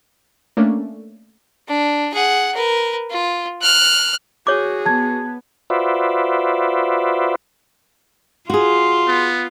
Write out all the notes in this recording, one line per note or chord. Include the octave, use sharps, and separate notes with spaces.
A3 A#3 C#4 D4
D4
G#4 F#5
A#4 B4
F4
F6 F#6
F#4 G#4 C#5 D6
B3 A5 G#6
F4 F#4 B4 C5 D5 E5
F4 F#4 G#4 C6
B3